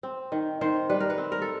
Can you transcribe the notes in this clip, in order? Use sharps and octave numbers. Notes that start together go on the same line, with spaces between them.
C4
D#3
D#3 C5
G3 B4
A#4
B4
C4
A#4
A4